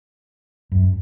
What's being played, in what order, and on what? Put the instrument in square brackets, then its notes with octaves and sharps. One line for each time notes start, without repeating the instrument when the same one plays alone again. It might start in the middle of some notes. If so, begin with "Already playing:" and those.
[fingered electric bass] F#2